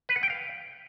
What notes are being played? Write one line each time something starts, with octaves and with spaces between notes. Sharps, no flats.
B4
F#5
G5
F5